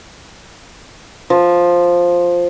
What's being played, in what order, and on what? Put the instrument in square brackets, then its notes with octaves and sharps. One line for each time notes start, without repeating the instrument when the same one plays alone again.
[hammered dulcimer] F3